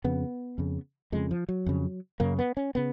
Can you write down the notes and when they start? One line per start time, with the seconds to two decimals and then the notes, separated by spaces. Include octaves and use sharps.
0.04 F2 C#3 B3
0.58 F2 C#3
1.12 F2 C#3 G#3
1.31 F3
1.49 F#3
1.66 F2 C#3
2.20 F#2 C#3 A#3
2.39 B3
2.57 C#4
2.75 C#3 B3